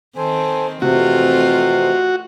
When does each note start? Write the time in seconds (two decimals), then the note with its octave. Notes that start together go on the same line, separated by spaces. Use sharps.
0.17 D#3 C4 A4 C5 G#5
0.82 F2 C3 E3 A3 C4 F4 F#4